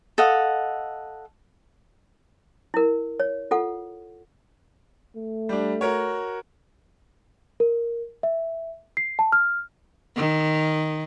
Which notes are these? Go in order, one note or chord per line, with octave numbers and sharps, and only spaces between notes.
A4 D#5 F5 F#5
E4 A#4
C#5
F4 A4 F#5
A3
G3 D4
F#4 A#4 C#5
A#4
E5
C7
A5
F6
D#3